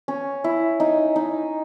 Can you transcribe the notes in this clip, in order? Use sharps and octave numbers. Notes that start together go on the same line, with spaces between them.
C#4
E4
D#4
D#4